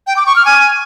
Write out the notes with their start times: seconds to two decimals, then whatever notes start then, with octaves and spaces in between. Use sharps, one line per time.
0.07 G5
0.17 D6
0.26 C#6
0.36 F6
0.45 G#5